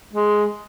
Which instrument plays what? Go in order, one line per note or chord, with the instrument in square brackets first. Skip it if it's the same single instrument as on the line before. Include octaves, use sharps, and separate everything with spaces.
[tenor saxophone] G#3